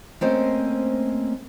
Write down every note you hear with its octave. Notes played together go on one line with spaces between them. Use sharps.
A3 A#3 C4 C#4 C5 D#5